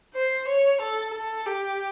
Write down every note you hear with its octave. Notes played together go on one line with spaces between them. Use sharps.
C5
C#5
A4
A4
G4